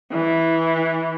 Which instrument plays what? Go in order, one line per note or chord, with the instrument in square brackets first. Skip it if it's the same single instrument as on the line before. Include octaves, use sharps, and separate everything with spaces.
[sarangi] E3